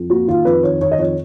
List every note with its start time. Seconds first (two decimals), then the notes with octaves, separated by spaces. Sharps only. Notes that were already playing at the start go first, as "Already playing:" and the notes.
Already playing: F2
0.10 A#3 F#4
0.28 D#3 F4
0.45 F2 B4
0.63 D#3 C#5
0.81 D#3 C#5
0.91 D#5
0.98 F2 C#5